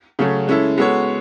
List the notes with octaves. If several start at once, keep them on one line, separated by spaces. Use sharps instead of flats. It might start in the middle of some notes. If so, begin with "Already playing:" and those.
C#3 F#3 A3 C#4
G#3 C#4 E4 A4
G#3 B3 F#4 A4 C#5